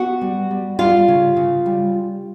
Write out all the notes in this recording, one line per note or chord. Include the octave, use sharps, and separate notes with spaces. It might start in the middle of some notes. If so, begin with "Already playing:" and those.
Already playing: B3 F#4 F#5
G3
G3
G3 F4 F5
C#3
C#3
G3